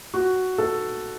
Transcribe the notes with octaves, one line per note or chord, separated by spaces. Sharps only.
F#4
A4